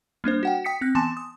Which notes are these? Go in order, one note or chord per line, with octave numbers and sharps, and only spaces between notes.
G3 A#3 D4 C5
F#4 F#5 G5
G5 D#6 B6 C#7
C4 F#6
E3 B3 G#5 A5 C6 E7
D#6